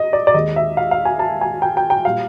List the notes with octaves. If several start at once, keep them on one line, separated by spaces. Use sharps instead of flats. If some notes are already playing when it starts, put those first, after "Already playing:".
Already playing: D#5
D5
D5
D#2 D#3 G#3 D#5
E5
F5
F5
G#5
A5
G#5
G5
G5
G5
A#2 G3 F5